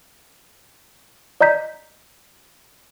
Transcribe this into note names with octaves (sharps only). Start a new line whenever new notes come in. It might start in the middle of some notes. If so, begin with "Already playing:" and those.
D5 D#5 A#5 G6 B6